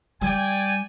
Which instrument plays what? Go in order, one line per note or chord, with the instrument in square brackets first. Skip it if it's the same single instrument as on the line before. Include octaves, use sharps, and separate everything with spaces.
[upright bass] G3 [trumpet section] D5 G5 G#5